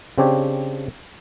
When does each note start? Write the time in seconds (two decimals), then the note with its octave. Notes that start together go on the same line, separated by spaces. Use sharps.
0.18 C#3 C4 D4 G4 C#5